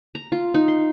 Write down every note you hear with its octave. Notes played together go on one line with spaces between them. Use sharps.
A#5
F4
D#4
C6